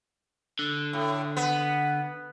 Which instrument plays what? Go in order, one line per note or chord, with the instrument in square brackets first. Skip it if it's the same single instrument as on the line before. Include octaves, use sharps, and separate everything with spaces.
[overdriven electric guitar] D3
[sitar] A2
B3